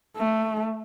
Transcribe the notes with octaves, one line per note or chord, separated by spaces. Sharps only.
A3